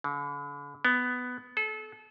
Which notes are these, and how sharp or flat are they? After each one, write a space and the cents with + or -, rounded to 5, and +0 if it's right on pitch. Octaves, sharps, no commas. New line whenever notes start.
D3 -45
B3 +10
A4 -30